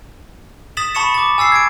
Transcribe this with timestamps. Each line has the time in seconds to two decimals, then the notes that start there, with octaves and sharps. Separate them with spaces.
0.77 D#6 A6 B6 E7 F#7
0.95 A5 B5 C#6 A6 C#7 E7
1.14 D6 A6
1.38 G#5 E6 A6 C7
1.52 G#6 D7